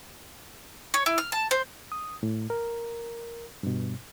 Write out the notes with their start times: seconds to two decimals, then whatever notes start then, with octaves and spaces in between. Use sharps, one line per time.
0.94 C#5
1.06 E4
1.18 F6
1.32 A5
1.51 C5
1.92 D#6
2.23 A2
2.50 A#4
3.63 G2 B2